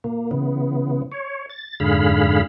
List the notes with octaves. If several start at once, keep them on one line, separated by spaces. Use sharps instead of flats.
A#2 A#3
C#3 E3 B3
C#5
A6
F2 G#2 D3 G#4 F5 B5